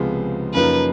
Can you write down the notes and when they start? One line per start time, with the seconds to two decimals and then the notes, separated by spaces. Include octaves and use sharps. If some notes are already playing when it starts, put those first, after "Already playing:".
Already playing: C#2 C3 F3 G#3 B3
0.54 F#2 C#3 F3 A#3 D#4 B4